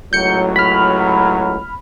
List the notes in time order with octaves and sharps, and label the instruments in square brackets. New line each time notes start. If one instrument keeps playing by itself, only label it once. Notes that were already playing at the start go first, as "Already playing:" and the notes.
[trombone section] C#2 A2 F#3 [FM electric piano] G6 C#7
[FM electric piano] B5 F6